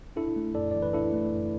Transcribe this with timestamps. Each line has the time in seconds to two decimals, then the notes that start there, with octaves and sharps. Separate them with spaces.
0.16 D4 E4 A4
0.36 A3
0.55 F#2 A4 D5
0.71 E3 D5
0.82 B4
0.93 D4 E4 A4
1.13 A3
1.32 F#2